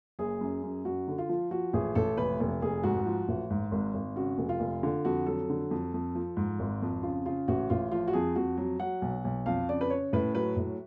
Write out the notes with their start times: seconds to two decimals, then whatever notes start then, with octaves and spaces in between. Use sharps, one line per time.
0.19 F#1 G#4
0.41 F#2
0.63 F#2
0.85 F#2 F#4
1.08 D3
1.18 F4
1.29 F3
1.51 F3 F#4
1.73 A1 G#4
1.95 A1 A4
2.17 F1 B4
2.40 F1
2.62 F1 G#4
2.83 G#2 F#4
3.06 F3
3.28 A1
3.50 G#2
3.72 G#1
3.94 G#1
4.16 C#3 F#4
4.38 F1
4.49 F4
4.60 F1
4.83 D3 F4
5.05 F2 F#4
5.26 F#3 A4
5.49 D3
5.71 F2
5.94 F2
6.15 F3
6.37 G#2
6.59 G#1
6.82 F2
7.03 C#3 F4
7.25 C#3 F4
7.48 A1 F#4
7.70 A1 F4
7.91 F3 F4
8.08 F#4
8.13 F2 G#4
8.35 F2 F#4
8.58 F#3
8.80 F#3 F#5
9.02 B1
9.24 B1
9.46 F2 F5
9.69 C#3 D5
9.81 B4
9.90 C#3 C#5
10.13 A2 B4
10.35 F#3 B4
10.56 A2